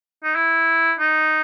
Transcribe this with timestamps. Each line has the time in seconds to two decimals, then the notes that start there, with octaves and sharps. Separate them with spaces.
0.24 D#4
0.35 E4
0.99 D#4